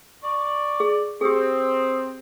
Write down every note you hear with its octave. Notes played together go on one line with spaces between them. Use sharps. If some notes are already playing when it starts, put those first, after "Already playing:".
D5 C#6
G#4
C4 G4 G#4 D#6